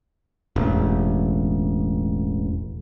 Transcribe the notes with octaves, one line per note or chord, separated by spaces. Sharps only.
E1 A1